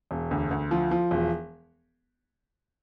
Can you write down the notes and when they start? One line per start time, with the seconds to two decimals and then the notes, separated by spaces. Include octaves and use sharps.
0.11 E1
0.31 D2
0.51 D2
0.71 F3
0.91 F3
1.11 E1